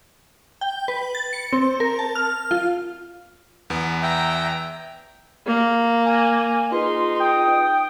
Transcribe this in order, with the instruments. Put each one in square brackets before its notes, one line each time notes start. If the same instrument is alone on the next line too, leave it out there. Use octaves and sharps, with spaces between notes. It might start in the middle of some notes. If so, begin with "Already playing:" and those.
[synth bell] G5
B4
A6
C#7
C4
A#4
A5
F6
F4
[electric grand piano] E2 B3
[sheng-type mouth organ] E5 G5 A#5
[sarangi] A#3
[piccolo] G#5
[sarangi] D#4 [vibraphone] F4 G#4 B4 [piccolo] C6
[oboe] G5 [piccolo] D#6